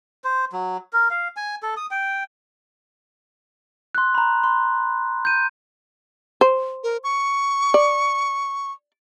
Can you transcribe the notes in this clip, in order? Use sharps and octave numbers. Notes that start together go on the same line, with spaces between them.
C5
F#3
A#4
F5
G#5
A4
D#6
G5
C6 F#6
A#5 B5
C6
G6 D#7
C5
A#4
C#6
D5